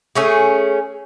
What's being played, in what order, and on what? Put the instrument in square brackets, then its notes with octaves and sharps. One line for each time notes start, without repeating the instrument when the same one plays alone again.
[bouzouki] A3 C#4 G#4